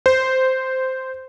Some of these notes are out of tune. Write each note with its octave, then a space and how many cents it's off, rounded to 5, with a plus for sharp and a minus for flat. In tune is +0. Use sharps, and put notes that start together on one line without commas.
C5 -10